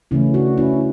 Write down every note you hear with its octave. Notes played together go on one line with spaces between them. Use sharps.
C#3 E3 A3 C#4 E4
D4 F#4
C#4 E4